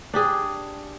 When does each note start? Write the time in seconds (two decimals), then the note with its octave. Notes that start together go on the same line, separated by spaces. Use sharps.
0.14 D4 G4 G#4